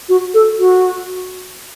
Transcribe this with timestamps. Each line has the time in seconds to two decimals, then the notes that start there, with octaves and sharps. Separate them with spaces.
0.09 F#4
0.34 A4
0.59 F#4